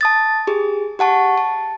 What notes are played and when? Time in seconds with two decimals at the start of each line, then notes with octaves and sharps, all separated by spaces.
0.01 A5 D#6 A6
0.47 G4 G#4
0.99 G4 F#5 A5 C#6
1.38 A5